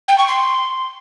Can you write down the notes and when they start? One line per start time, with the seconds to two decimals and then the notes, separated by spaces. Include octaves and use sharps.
0.08 G5
0.18 C#6
0.28 C6